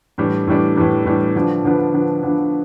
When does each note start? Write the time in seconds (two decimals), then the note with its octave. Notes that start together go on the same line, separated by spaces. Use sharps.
0.18 A2 E3 G3 D4
0.47 A2 E3 G3 D4
0.77 A2 E3 G3 D4
1.06 A2 E3 G3 D4
1.35 D3 F3 B3 D4
1.64 D3 F3 B3 D4
1.94 D3 F3 B3 D4
2.23 D3 F3 B3 D4